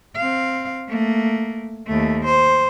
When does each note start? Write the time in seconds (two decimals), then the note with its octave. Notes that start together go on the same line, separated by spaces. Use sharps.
0.16 C4 F5
0.89 A3 A#3
1.87 D#2 A3
2.25 C5